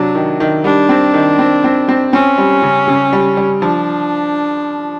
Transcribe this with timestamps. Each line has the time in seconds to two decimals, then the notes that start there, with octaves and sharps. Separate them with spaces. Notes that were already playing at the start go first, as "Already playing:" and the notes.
Already playing: C3 F#3 D4
0.15 D#3
0.40 D#3
0.64 G3 D4
0.89 C4
1.14 D#3
1.39 C4
1.64 C4
1.89 C4
2.13 C4 C#4
2.38 G3
2.62 C#3
2.88 C#3
3.13 G3
3.37 G3
3.62 F3 D4